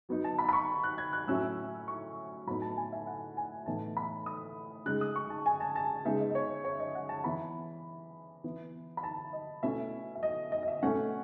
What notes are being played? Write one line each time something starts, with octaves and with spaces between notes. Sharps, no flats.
F#3 B3 D#4
A5
B5
B5
C#6
F#6
G#6
F#6
A2 F#3 C#4 E4 E6
C#6
A2 F#3 B3 D#4 B5
A5
G#5
E5
F#5
G#5
A2 E3 B3 D#4 A5
B5
D#6
C#3 G#3 D#4 F#6
D#6
C#6
A5
G#5
A5
A5
C#3 G#3 B3 D#4 E5
D#5
D#5
C#5
C#5
D#5
F#5
A5
E3 B3 E4 B5
E3 B3 E4
B5
A5
D#5
B2 A3 C#4 E4 E5
E5
D#5
D#5
D#5
E5
B2 A3 C#4 F#5